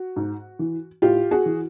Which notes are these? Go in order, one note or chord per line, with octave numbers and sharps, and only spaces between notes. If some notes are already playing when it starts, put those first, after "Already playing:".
Already playing: F#4
G#2
E3
A2 F4 G4
F#4 G#4
E3